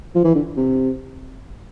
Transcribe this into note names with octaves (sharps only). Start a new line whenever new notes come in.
F3
E3
D3
C3